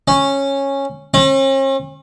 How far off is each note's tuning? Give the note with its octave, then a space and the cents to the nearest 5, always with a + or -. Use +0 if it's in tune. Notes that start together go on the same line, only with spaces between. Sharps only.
C#4 -10
C#4 -45